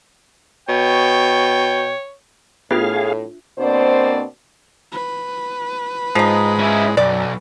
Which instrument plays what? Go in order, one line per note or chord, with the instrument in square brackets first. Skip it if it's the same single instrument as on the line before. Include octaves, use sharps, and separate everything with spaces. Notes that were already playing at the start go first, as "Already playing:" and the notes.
[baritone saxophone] B2 [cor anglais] C#5 [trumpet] G5
[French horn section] A2 [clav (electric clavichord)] B3 G4 [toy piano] D4 F4 E5 [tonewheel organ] G#4 F5
[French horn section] B2 A#3 C4 D4 C5 D5
[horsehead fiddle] B4
[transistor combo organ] G#2 G#3 [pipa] F3 D#4
[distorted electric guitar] C#4 E4
[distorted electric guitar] B1 [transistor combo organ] F#2 [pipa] D5